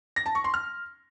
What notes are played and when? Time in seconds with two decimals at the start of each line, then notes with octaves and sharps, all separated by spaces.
0.16 A#6
0.26 A5
0.35 C#6
0.44 C6
0.54 F6